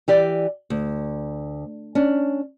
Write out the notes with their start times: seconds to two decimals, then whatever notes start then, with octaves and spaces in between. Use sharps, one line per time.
0.08 E3 G4 D5
0.70 D2
1.95 C#4 D4